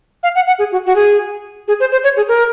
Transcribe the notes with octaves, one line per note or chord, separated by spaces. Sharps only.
F5
F#5
F#5
G#4
F#4
F#4
G#4
G#4
C5
C5
C#5
G#4
A#4